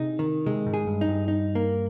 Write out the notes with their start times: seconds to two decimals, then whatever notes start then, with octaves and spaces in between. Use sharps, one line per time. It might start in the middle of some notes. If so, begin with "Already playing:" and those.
Already playing: C3 D#4 G#4
0.19 D#3
0.46 C3 G#3
0.66 G#2
0.74 G#4
0.87 G2
1.01 D#4
1.08 G2
1.28 D#4
1.55 A#3